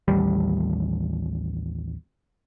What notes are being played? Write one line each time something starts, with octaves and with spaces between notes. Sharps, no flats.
A1 D#2 G3